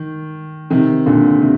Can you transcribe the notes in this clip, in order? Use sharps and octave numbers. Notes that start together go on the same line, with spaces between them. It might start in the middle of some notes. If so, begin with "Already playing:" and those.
Already playing: D#3
C3 D#3
A#2 D3
C3